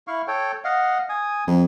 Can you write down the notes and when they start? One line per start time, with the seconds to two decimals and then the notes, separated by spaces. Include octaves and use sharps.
0.08 E4 F5 C#6
0.28 A4 C#5 G5
0.64 D#5 F5 F#5
1.09 G#5 D#6
1.47 F2